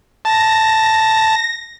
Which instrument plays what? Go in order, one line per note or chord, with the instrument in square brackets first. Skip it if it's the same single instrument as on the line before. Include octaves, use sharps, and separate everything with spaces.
[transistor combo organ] A5 [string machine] A#6